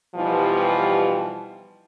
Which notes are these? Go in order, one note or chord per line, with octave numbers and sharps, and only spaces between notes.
B2 E3 F3 G3 D#4 G4